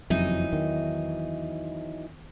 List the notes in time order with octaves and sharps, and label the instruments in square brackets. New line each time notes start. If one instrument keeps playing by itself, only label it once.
[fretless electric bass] F#1 F2 [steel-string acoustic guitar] E3 F#3 D#4
[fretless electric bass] E2 D#3